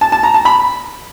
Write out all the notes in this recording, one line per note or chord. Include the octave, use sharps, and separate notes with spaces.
A5
A5
A#5
A5
B5